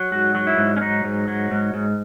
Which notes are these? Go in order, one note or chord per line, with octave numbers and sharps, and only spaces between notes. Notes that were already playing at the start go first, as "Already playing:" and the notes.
Already playing: F#3
G#2 F#4
F#3
E4
G#2
C#4
F#3 D#4
G#2
F#3
G#2
G#2